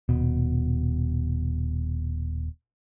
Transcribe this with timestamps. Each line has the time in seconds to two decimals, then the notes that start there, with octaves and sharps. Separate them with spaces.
0.09 D#1 B2